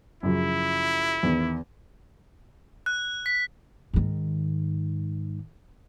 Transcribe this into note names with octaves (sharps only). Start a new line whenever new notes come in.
F#2 C#3 F3 E4
E2 D#3
F#6
B6
G#2 D#3